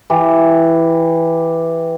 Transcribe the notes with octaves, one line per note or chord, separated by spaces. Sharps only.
E3 G4